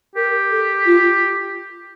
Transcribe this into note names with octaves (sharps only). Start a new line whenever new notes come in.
G4 A#4
A4
F4